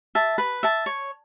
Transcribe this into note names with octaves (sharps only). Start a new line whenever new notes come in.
E5 A5
B4
E5 A5
C#5